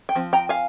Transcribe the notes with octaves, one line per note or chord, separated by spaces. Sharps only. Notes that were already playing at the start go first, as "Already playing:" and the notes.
G5
F3 C4
G5 A#5
F5 G#5